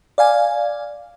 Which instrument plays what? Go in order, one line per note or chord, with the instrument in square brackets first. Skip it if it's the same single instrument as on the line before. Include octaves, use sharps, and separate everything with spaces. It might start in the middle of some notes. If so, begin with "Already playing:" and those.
[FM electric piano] D5 F5 G#5